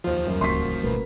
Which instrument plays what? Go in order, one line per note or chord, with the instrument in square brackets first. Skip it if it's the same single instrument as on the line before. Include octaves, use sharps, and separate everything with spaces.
[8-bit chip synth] D#2 F3 [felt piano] F4 C5
[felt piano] F#2 [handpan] G3 C#4 A#4
[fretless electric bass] D1 C#2 [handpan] G3 A#3 F#4 [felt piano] C6 C#6 B6
[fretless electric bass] G#1 B2 A3 [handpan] A#4 B4